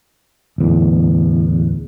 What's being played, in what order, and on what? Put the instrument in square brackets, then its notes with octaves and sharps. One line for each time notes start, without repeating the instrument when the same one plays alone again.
[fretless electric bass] D1 E2